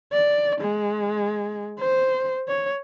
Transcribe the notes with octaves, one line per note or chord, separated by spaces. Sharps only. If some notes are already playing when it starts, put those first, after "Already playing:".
D5
G#3
C5
C#5